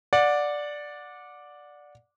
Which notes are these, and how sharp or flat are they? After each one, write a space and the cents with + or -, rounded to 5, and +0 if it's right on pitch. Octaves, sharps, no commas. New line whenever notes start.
D5 +0 F#5 -25